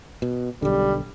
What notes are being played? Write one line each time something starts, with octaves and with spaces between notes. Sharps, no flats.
B2
B1 D3 G3